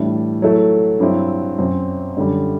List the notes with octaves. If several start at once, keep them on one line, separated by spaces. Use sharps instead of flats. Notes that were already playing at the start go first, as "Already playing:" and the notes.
Already playing: A2 E3 G3 D4
F#3 A3 E4 A4
G2 F#3 C4 E4
F#2 F#3 C4
F#2 D3 G3